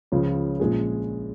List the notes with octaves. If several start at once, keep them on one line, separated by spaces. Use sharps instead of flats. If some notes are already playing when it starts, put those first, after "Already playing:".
C#2 C#3 F3
A#1 A#2 G#3 C#4 G#4